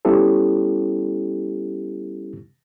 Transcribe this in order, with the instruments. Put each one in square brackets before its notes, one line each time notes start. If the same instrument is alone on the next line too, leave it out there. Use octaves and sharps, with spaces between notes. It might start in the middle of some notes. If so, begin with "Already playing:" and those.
[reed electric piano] G3 B3 C#4 E4 G4 A4